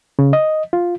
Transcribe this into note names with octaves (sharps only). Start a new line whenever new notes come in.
C#3
D#5
F4